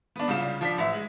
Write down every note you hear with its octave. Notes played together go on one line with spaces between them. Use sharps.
B3 D4
C2 C#3 G3 F4 E7
F3 D4 B6
A1 E5
G#3